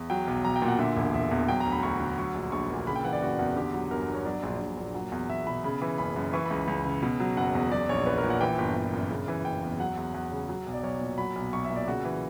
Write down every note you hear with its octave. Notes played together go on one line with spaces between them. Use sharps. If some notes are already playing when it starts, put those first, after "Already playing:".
Already playing: E2
F#3 G5
B1
B1 A#5
G5
A#2
F#5
D3 E5
E1
E1 E5
E2
F#3 G5
A#5
D2
B5
D2 C#6
D3
F#3 C#6
A#1
A#1 C#6
A#2
C#3 B5
G5
E3 F#5
D5
F#1 F#4
E2 F#4
D3 G4
F#3
G1 A#4
G2
C#5
F#3 D5
A#1
A#1
A#2
F#3
E2
E2 E5
B2 B5
C#3 B5
E3
F#1 B5
F#2
E3 C#6
B5
C#2
C#2
C#3
B2
F#3
F#1 F#5
E2
F#3 D5
A#1 C#5
A#1 B4
A#4
A#2
F#5
E3 G5
G1
G1
F#2
C#3
E3
F#1 G5
E2
F#3 F#5
E2
E2 F#5
C#3
F#3
B1
D5
B1 C#5
A#2
F#3 B5
B1
B1 C#6
E5
A#2
D5
C#3 F#4
E3